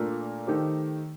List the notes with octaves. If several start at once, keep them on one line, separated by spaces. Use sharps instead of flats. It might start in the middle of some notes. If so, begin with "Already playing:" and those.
Already playing: A#2 A3 D4 F4 A#4
D#3 A3 D#4 G4 C5